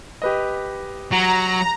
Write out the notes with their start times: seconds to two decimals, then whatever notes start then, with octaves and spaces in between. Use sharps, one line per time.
0.22 G4 B4 D#5
1.11 F#3 A#5